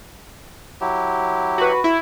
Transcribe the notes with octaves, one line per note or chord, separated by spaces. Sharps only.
F#3 E4 G4
F#4 B4
E4